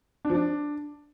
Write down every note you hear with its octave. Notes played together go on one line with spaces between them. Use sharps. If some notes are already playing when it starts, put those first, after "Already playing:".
D4
F3
D4